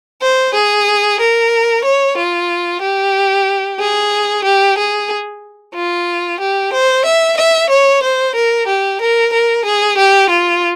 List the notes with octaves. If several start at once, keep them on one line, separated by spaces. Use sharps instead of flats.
C5
G#4
A#4
C#5
F4
G4
G#4
G4
G#4
F4
G4
C5
E5
E5
C#5
C5
A#4
G4
A#4
A#4
G#4
G4
F4